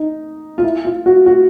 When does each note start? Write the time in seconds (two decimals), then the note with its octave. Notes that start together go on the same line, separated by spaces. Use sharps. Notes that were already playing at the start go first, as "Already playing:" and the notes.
Already playing: D#4
0.58 F4
0.63 E4
0.85 F4
1.06 F#4
1.26 F#4